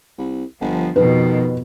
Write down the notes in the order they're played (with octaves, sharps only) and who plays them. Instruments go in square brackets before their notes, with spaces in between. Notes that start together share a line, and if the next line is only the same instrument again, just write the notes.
[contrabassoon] C2
[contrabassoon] G1 [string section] F3
[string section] F2 B2 [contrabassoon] D#3 [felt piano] B4